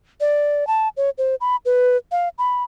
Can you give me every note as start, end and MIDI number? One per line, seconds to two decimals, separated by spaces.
0.20 0.67 74
0.67 0.89 81
0.97 1.10 73
1.18 1.35 72
1.41 1.56 83
1.65 1.97 71
2.12 2.29 77
2.38 2.64 83